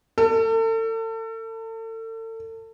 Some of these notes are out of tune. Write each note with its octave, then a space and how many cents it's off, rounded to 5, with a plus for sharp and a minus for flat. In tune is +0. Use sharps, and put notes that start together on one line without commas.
A4 +35